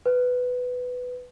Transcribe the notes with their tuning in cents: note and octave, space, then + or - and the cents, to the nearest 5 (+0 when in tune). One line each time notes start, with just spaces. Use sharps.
B4 +10